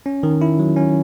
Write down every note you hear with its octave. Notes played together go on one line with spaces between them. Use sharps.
C#4
D#3
E4
F#3
C#4